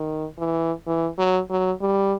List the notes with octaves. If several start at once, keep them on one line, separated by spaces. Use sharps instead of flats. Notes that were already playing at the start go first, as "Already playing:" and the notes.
Already playing: D#3
E3
E3
F#3
F#3
G3